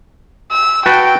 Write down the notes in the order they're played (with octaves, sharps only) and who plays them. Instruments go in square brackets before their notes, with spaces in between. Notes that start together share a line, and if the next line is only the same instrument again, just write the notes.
[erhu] E6
[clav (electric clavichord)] F#4 B4 A5 [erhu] G5